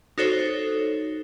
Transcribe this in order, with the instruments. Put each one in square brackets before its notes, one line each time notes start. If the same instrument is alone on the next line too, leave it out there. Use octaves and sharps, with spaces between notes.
[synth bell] D#4 F#4 A4 C5 C#5